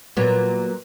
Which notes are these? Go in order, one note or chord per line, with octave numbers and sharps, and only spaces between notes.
A#2 F#3 B3